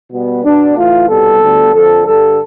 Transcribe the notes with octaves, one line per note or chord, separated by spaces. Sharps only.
B2 G3 B3
B2 B3 D4
A2 E3 A3 F4
C2 B2 G3 B3 A4
D2 D3 G3 B3
F2 D3 F3 A4
G2 D3 G3 A4